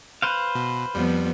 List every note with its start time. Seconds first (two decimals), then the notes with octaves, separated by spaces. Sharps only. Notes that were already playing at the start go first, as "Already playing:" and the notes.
0.22 B4 C5 F5
0.55 B2
0.95 F2 F3 G3 B3